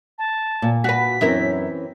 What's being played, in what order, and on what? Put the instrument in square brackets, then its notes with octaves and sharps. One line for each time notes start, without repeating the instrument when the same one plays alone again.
[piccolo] A5
[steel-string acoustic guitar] A#2
[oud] F#4 B4 [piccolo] B6
[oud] F#2 E4 A#4 [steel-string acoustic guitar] E3 C4 C#4